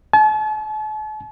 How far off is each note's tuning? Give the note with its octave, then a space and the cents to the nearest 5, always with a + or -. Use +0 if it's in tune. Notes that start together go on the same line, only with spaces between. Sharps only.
A5 -40